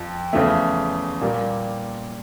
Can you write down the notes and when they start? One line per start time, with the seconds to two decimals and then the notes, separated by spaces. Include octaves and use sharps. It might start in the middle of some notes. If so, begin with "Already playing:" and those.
Already playing: F2 F3
0.33 E2 C#3 F3 A3
1.21 A#2 G3 A#3